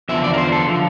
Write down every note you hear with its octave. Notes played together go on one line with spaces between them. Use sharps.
E2 D3 F3 E5
D5
A#4
C5
A4
D3 F3